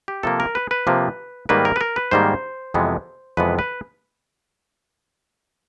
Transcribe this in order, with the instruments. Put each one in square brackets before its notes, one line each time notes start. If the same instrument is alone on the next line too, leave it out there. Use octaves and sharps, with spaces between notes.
[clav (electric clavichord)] G4
C3 F3 A#3 A4
A#4
B4
B4
C3 F3 A#3
G#2 D#3 G3 A#3 B4
A#4
B4
A#4
B4
G#2 D#3 G3 A#3 C5
F2 C3 E3 G#3 B3
F2 C3 E3 G#3 B3 B4
B4